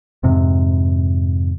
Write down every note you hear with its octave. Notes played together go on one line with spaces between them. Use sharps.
F2 G#2 C3